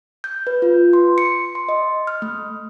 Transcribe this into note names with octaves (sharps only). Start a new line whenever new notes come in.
G6
B4
F4
C6
C#7
C6
D#5
F6
A3